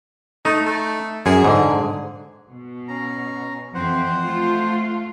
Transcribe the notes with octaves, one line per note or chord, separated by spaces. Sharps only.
A3 D#4
A3
F#2 G#4
G#2 D3
B2
C#4 A#5
F2 E3 C4 C5 F#5
A3 F4